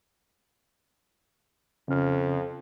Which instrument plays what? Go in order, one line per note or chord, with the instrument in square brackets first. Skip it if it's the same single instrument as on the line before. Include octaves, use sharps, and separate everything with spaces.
[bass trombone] F2 [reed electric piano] C#3 C#4 F6